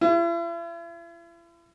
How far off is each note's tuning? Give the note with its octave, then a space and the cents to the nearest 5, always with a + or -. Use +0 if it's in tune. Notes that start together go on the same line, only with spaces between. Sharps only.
E4 +45